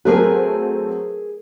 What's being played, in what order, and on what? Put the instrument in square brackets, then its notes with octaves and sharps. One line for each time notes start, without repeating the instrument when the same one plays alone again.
[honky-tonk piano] F#3 A3 C4 [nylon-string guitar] G#4 A#4 B4